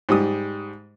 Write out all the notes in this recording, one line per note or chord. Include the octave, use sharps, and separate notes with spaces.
G#2 G3 D#6